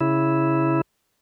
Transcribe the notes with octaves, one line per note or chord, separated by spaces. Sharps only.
C#3 E4